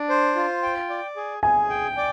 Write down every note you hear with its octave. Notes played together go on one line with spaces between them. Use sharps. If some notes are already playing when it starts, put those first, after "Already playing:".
Already playing: D4
C5
F4
G5
D5
G#4
G#4 G#5
G5
D5